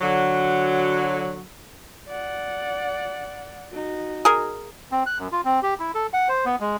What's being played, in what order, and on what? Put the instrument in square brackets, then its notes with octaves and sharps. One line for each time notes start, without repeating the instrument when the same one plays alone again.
[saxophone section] D3 F#3
[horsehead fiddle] D5 F#5
D#4 F#4
[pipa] G#4 A#4
[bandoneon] C4
F#6
F#2
F4
C4
G4
E4
A4
F#5
C5
B3
G#3